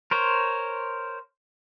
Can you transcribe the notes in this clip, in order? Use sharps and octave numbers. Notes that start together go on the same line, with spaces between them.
A#4 C5 C#5